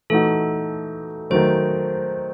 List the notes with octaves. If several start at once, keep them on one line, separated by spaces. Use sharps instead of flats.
E3 A3 D#4 F#4 A4
D#3 F#3 A3 C5